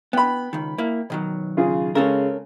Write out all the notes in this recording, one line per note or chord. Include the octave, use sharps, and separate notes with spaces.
B3 G5 B5
C#2 D#3
A#3 E4
B2 D#3 F#3
C#3 F4 G#4
C#3 G#3 C#4 A4 A#4